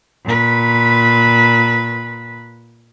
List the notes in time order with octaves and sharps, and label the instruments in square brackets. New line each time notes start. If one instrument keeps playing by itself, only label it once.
[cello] A#2 B4